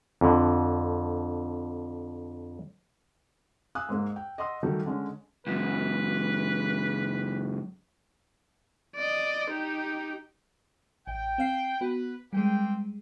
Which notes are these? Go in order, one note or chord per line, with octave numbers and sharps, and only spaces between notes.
F2 D3
F5 G#5 D#6 E6 F#6
G#2 G#3 A#3
G5
D#5 F#5 C6 D#6 E6
D#3 F#3 G3 A3 G4
D3 G#3 C#4
C#2 F#2 B4
D5 D#5
D#4 G4
A1 G5
C4 F5 C7
B3 F#4 B4
G3 G#3 A#3 C4 G5